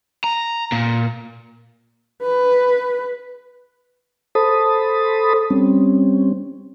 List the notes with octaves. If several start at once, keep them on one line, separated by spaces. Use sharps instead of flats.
A#5
A#2
B4
A4 C5 A5 B5 D#6
G3 C4 C#4